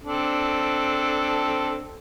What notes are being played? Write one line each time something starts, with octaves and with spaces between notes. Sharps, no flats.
C4 D4 A4